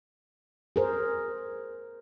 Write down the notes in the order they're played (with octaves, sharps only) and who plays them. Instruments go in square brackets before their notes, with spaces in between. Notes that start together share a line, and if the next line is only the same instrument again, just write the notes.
[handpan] G#4 A#4 C5